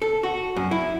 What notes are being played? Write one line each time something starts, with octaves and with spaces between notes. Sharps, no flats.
A4
F#4
F#2
E4